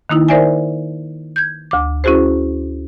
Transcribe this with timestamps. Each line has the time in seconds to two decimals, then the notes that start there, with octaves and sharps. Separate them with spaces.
0.09 D#3 A#3 D#4 E4
0.29 A#4 C5 D5 E5 G#5
1.36 G6 G#6
1.71 D2 D6
2.04 C#4 E4 F#4 G#4 C5